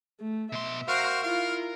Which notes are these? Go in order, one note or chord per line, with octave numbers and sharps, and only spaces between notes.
A3
B2 E5 C6
F#4 A#4 C5 F5
E4 F4 F5